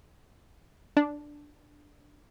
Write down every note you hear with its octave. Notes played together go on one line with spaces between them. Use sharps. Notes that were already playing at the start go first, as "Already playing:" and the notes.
D4